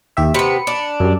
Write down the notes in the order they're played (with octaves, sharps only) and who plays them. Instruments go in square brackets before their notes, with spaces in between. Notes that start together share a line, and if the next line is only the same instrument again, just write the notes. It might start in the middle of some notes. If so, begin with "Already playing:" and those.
[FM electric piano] D#2 G4 E5
[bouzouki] C3 B3 [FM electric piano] B5 C#7
[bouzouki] D4
[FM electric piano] F#2 G3